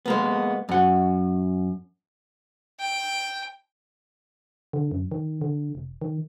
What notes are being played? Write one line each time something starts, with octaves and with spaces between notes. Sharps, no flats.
G#3 A#3 B3
F#2 F#5
G5
D3
F#2
D#3
D3
F1
D#3